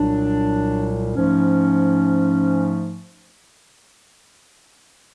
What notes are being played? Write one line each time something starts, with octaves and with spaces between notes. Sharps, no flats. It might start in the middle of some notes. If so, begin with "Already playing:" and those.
Already playing: C2 A#2 F#3 D4
G#2 F3 A3 C#4